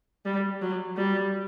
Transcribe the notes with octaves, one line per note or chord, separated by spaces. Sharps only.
G3
F#3
G3